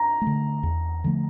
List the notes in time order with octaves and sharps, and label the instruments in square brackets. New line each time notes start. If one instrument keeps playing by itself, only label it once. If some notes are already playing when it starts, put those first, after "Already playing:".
Already playing: [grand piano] A#5
[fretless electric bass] A3
D3
E2
D3 F3 A3